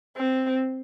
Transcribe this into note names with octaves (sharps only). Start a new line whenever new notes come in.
C4